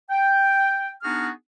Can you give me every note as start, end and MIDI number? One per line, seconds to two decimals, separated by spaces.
0.10 0.91 79
1.04 1.29 59
1.04 1.29 62
1.04 1.29 63
1.04 1.29 66
1.04 1.29 68
1.04 1.29 89